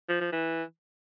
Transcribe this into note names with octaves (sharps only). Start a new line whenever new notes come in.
F3
F3
E3